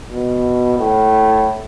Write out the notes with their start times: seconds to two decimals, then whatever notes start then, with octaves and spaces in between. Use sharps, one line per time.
0.12 B2
0.79 A2